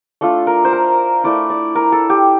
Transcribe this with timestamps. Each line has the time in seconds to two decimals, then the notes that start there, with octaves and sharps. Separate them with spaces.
0.21 A3 D4 F4 A4
0.47 A#4
0.65 C5
0.73 A#4
1.24 A3 E4 D5
1.50 D5
1.75 A#4
1.92 A4
2.10 G4